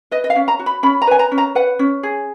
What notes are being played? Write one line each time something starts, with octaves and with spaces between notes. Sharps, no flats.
B4 D#5
D#5
F5
C#4
A#5
F#4
B5
C#4 B5
A#5
B4 G#5
A#5
C#4
A#5
B4 F#5
C#4
G#4